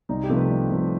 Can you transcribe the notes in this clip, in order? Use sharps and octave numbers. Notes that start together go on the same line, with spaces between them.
C2 D#4
G4
C3 F3 A3
B4
C2
C3 F3 A3